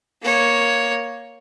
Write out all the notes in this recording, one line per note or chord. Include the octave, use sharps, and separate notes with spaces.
A#3 C#5